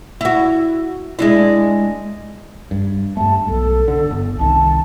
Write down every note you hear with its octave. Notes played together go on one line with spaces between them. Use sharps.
E4 F#4
G#3 D4 E4
G2
G2 A3 A5
B1 A4
D3
D1 G1
C2 D#3 A5